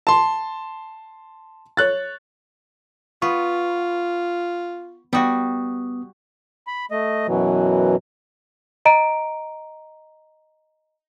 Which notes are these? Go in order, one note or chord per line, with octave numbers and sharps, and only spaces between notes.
A5 C6
C#5 F#6 A6
B3 F4 C#6
G3 B3 F#4 D#6
B5
A3 D#5
F#2 B2 E3 F#3
D#5 A#5 D7